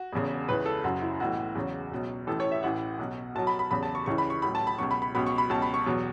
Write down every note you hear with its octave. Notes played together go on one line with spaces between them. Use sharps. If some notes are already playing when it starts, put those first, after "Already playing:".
Already playing: F#4
E1 E2 C#3
C#2 C#3 E3 B4
A4
F#1 F#2 C#3 F#4
E4
B1 A2 E3 F#4
E2 C#3 F#3
C#2 B2 F#3
A1 A2 E3 A4
C#5
E5
A1 A2 E3 F#5
B1 B2 F#3
B1 B2 F#3 A5
B5
B5
E2 C#3 F#3 B5
A5
C#6
C#2 C#3 E3 C#6
B5
C#6
A1 A2 F#3 B5
A5
B5
C#2 B2 F#3 C#6
B5
B5
C#2 B2 F#3 B5
C#6
B5
C#2 B2 F#3 A5
B5
C#6
E2 B2 F#3